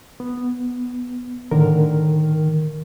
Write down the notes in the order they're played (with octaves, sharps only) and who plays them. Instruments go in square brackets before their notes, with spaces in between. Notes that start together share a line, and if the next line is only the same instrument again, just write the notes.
[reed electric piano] B3
[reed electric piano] A2 D3 A#4 [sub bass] D#3